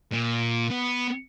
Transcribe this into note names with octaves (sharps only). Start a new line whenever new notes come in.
A#2
B3